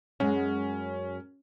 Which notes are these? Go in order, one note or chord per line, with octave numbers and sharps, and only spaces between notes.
F#2 G#3 C#4